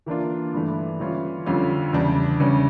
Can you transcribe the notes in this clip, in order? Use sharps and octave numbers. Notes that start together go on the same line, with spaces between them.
E3 A#3 D4 F4
G2 E3 A3
E3 G3 C#4 F4
F2 D3 G3 C#4 F4
E2 C#3 G3 D4
E2 C#3 G3 C#4